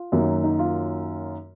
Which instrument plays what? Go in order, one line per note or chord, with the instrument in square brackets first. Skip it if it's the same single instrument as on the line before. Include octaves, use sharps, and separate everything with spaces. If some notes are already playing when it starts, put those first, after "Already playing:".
Already playing: [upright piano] F4
F#2 D#3 F#3 A#3
D#4
F4